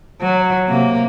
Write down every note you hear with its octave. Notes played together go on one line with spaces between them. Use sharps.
F#3
C3 A#3